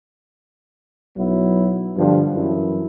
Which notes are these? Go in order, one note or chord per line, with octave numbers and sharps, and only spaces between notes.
B1 F#3 B3 E4
G2 D3 F3
F#2 E3 E4